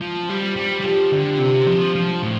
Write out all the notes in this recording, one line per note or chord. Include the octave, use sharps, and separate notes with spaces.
F3
C4
G3
C4
G3
D4
G3 G4
F3 F4 A4
D3 D4 G4
C3 C4 D4
F3 C4
D4
F3
C4
A2